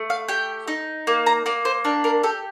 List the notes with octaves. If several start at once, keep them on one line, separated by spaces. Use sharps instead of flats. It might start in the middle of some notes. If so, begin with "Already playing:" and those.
Already playing: A3
F5
G4 G5
D#4
A#3
A#5
A#3 D5
C5
D4 A#4
A#4
G4 A4